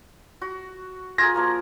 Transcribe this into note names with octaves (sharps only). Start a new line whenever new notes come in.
F#4
F4 G#4 A#4 G#6 A#6
F3 A#3 F#4